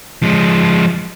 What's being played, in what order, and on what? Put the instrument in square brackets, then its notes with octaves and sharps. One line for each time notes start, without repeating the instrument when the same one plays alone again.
[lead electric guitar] F3 G#3